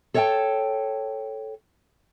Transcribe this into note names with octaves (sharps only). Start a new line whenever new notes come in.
A4 C#5 D#5 F5 G5 A5